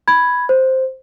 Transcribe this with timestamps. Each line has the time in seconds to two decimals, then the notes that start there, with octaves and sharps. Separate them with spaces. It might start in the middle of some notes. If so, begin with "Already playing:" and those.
0.08 B5 G#6
0.49 C5